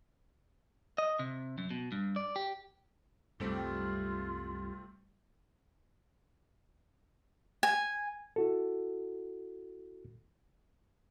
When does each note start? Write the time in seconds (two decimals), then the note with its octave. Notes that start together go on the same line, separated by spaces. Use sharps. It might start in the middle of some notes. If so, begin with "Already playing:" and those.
0.98 D#5
1.19 C3
1.58 F#2
1.71 B2
1.92 G2
2.16 D5
2.36 G4
3.40 C2 F#2 G3 A3 C4 F4 G4
7.63 G#5
8.36 E4 F#4 A4